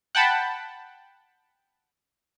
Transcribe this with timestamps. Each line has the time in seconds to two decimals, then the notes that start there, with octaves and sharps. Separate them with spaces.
0.15 F#5 G5 A5 B5